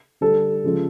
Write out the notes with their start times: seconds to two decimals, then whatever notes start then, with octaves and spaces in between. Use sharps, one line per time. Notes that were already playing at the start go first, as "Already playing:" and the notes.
0.21 D3 G3 A4
0.64 C#3 F3 G#3